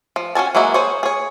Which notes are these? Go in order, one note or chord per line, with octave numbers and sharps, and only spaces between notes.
F3
C#4 F#4 G#5 A5
F#3 G#3 A#3 E4 F#4
G#4 C5 C#5
G#4 C#5